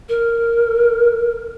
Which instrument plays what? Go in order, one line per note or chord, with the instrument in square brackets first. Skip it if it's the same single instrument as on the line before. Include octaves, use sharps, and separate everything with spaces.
[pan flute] A#4